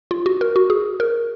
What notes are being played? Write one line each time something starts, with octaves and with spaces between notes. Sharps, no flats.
F4
F#4
A#4
F#4
G#4
A#4